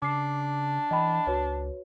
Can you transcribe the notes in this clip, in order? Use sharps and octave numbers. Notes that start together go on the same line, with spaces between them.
C#3 D4 D6 C7
E3 D#5 G5 B5
C#2 F#4 B4 C#5